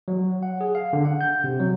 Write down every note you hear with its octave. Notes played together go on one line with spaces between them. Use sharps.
F#3
F#5
G#4
F5
D3
F#5
G6
C3
F#3